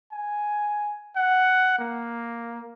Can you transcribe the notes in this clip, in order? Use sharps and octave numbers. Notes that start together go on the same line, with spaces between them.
G#5
F#5
A#3